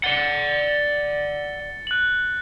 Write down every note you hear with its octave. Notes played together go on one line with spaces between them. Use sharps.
D5 F#5 A6 C#7 G7
F#6 F#7